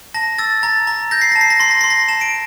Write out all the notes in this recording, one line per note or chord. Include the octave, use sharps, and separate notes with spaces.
A5 A#6
E6 A6
A#5 A6
A#5
G6 A#6
C7
A5 A#6
C7
A#6
C6 C7
A#6
C6 C7
A#6
A5 E7
D7